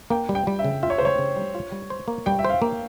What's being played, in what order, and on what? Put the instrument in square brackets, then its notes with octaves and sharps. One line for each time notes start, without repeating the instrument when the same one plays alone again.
[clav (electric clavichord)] A#3 [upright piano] G5
[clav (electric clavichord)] G3
[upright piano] G5
[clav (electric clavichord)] G3
[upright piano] E5
[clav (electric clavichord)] C#3
[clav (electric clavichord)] F4 [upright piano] E5
[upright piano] C#5
C5
[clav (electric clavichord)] C#3 [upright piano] C#5
[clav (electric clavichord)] C#3
G3
F4
G3
C5
A#3
[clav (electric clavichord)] G3 [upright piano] G5
[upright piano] E5
[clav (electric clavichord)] C5 [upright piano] F5
[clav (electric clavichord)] A#3